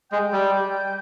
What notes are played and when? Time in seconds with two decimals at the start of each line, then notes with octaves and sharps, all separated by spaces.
0.11 G#3 G5
0.33 G3